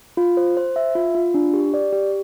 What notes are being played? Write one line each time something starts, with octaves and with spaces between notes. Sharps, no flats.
F4
C5
C5
E5
F4
F4
D4
G4
D5
G4